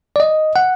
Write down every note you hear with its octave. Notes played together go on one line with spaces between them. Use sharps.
D5
D#5
F#5